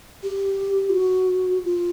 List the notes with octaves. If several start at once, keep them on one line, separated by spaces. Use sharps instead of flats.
G4
F4
F#4
F4